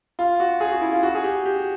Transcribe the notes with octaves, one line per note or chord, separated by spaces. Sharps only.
F4
F#4
G#4
F#4
E4
F4
F#4
G#4
G4
G4